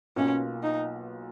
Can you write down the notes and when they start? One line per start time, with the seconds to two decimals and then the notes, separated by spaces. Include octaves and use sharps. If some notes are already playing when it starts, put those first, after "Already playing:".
0.16 B1 B2 A#3 C#4 F4
0.63 D#4